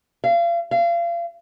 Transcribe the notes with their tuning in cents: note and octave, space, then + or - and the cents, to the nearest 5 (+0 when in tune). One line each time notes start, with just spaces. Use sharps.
F5 -35
F5 -35